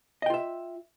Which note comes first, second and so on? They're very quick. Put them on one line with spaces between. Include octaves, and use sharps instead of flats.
D#5 G5 F4 E5